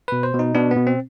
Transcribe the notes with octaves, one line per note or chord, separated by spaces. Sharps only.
B2 B4
C5
B2
D#4
B2 D4
B2 B3
C4